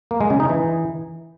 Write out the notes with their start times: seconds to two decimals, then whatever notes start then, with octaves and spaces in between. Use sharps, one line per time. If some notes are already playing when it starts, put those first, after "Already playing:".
0.11 A#3
0.21 G#3
0.30 C#3
0.40 D#4
0.49 E3